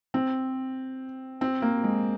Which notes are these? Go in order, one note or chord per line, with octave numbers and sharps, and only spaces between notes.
C4
C4
A#3
G#3